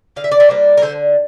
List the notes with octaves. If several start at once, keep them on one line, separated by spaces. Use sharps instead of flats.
D3 F5
E5
D5
C5 E5
G3 A#3 D4
A#4
D3 A4 C5